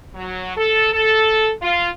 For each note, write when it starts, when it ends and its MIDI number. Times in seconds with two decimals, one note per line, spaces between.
0.15 0.54 54
0.57 0.92 69
0.93 1.51 69
1.62 1.89 65